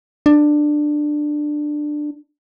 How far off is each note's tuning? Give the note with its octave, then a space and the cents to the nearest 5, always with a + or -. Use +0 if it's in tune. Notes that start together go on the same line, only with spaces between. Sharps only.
D4 +15